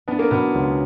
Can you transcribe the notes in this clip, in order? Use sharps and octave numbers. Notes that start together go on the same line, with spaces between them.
B3 D4
A#3
B2 B3
C#2